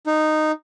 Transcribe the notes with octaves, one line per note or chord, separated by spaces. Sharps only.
D#4